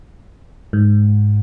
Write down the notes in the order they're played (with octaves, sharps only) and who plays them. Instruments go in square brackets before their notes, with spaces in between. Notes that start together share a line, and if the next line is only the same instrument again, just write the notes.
[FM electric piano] G#2